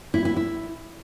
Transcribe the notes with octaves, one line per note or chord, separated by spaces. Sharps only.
E4
E4
E4